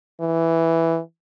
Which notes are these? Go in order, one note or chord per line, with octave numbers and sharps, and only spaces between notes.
E3